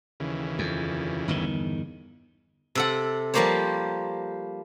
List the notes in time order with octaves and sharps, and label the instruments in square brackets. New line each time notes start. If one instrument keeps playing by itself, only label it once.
[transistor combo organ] D#2 C#3 E3
[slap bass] F2
G1 E2 D#3
[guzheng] C3 A4 F#5
F3 G3 A#3 G4 C5 C#5